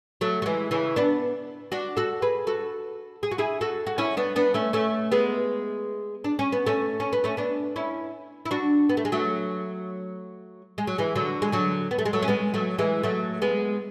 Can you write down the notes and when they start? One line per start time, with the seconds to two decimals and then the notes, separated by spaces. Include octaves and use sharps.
0.21 F#3 A3
0.42 F#3
0.46 E3 G#3
0.71 C#3 E3
0.96 B3 D4
1.72 D4 F#4
1.97 F#4 A4
2.22 G#4 B4
2.47 F#4 A4
3.23 G#4
3.31 F#4
3.38 E4 G#4
3.61 F#4 A4
3.87 F#4
3.98 C#4 E4
4.17 B3 D4
4.36 B3 D4
4.54 A3 C#4
4.73 A3 C#4
5.12 G#3 B3
6.24 D4
6.39 C#4
6.52 B3
6.66 A3 C#4
7.00 C#4
7.13 B3
7.24 A3 C#4
7.37 B3 D4
7.76 C#4 E4
8.45 E4
8.51 D4 F#4
8.89 B3
8.97 A3
9.05 G#3
9.12 F#3 A3
10.78 G#3
10.87 F#3
10.98 E3 G#3
11.15 D3 F#3
11.42 G#3
11.52 D3 F#3
11.91 B3
11.98 A3
12.05 G#3
12.13 F#3 A3
12.22 C#4
12.28 G#3 B3
12.54 F#3 A3
12.78 E3 G#3
13.03 F#3 A3
13.42 G#3 B3